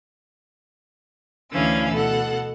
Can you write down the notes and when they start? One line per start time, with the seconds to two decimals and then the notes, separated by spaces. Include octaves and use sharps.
1.52 D2 D3 E3 C#4 F5 E6
1.93 B2 A4 F#5